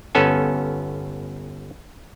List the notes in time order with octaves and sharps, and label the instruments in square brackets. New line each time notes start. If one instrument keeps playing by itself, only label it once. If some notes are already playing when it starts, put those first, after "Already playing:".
[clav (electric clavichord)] G1 B3 C#4 A4 G#5